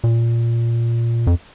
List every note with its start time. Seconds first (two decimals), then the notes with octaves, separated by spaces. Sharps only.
0.04 A#2
1.27 F2